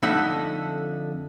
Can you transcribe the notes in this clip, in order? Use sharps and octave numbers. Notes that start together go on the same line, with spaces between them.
F2 D3 A3 D#4 E5 F#5